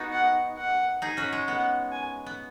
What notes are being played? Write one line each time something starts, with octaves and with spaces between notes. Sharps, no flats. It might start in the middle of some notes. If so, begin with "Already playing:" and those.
Already playing: B3 D#4 F#4
F#5
F#5
D#4 G#4
C#4 F#4
G#3
B3 F#5
G#5
B3